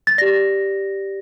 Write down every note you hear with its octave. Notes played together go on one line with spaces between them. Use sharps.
A6
G4 D5 A#6